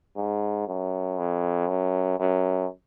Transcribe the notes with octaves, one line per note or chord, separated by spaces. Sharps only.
G#2
F#2
F2
F#2
F#2